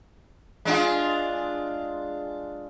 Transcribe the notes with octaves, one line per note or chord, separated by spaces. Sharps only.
G#3 D4 F4